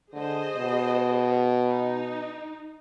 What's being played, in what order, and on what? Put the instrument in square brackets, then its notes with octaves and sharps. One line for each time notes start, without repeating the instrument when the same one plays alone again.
[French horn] D3 [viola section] G#4 C5 D#5
[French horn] B2
[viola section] D#4